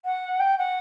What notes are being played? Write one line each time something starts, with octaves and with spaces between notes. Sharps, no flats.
F#5
G5
F#5